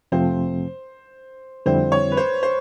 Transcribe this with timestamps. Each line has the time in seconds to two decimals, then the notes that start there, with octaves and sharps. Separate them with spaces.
0.12 F2 C3 F3 A3 C4 C5
1.66 F2 D3 G3 C4 E4 C5
1.92 C#5
2.12 B4
2.17 C5
2.43 C5